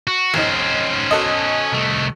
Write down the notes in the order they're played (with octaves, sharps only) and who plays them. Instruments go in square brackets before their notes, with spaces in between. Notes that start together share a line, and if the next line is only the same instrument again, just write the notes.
[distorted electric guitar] F#4
[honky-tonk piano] F1 D#4 [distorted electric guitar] C#4 C5
[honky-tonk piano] F#4 A4 D#5
[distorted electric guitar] C2 A3